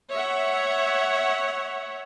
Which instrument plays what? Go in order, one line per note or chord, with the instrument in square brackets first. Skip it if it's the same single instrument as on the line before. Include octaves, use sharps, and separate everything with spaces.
[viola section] C#5 E5 F#5